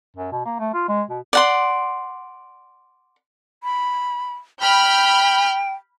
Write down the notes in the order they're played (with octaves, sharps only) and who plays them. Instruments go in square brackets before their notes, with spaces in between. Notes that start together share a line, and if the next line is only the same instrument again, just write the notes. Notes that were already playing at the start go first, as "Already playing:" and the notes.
[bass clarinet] F#2
B2
A#3
A3
F4
G#3
B2
[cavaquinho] D5 F#5 C6
[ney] B5
[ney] G5 [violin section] B5 F6 G6